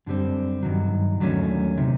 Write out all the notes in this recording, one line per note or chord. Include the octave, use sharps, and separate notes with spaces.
F#2 D3 G3 C4
G2 D#3 F#3
D#2 D3 F#3 A3 C#4
C3 D#3